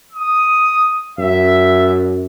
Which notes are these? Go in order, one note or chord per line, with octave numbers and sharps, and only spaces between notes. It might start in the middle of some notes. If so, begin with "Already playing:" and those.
D#6
F#2 E5